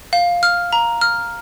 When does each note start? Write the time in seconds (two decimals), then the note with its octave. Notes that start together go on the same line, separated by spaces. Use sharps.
0.13 F5
0.43 F6
0.73 A#5
1.01 F6